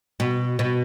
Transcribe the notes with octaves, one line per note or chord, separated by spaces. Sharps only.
B2
B2